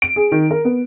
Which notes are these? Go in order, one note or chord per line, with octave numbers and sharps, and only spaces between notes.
D7
G#4
D#3
A#4
B3